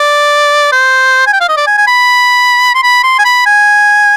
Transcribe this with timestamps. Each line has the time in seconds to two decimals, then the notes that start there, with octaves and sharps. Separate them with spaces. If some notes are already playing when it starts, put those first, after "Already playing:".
Already playing: D5
0.72 C5
1.27 G#5
1.33 G5
1.41 F5
1.49 D#5
1.57 D5
1.67 G#5
1.78 G#5
1.87 B5
2.75 C6
2.83 B5
3.03 C6
3.19 G#5
3.25 B5
3.46 G#5